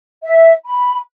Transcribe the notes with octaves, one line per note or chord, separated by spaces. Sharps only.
E5
B5